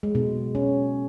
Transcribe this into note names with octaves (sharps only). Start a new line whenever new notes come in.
G#3
B2
C#4